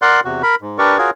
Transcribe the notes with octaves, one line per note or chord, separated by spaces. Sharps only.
A#4 D5 F#5 C6 F#6
E2 C3 F#4
A#4 B5
G#2
D4 G4 A#4 B4 D5 C#6
F4 F#4 G#4 A#4 C#5